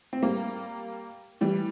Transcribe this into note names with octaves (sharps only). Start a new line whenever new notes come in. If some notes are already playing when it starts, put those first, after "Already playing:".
C4
G3 A#3
E3 G3